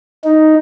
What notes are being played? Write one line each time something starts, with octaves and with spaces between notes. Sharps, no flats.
D#4